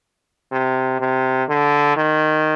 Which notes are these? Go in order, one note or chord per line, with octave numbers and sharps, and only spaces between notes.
C3
C3
D3
D#3